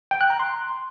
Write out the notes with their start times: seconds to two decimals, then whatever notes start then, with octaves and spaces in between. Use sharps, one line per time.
0.11 G5
0.21 F#6
0.30 A#5
0.40 C6